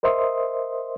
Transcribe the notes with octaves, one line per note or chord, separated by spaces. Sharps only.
A#4 C5 D#5 E5 C6 D#6